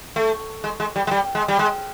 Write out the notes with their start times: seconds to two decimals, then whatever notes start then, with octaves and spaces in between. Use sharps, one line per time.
0.16 A3
0.64 G#3
0.80 G#3
0.96 G3
1.07 G#3
1.11 G3
1.35 G#3
1.48 G3
1.59 G#3